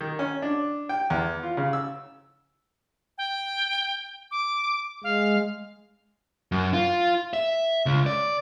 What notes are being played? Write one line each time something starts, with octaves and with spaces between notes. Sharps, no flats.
D#3
C#4
D4
G5
E2
F4
C#3
E6
G5
D6
G#3 F5
F#2
F4
E5
C#2
D5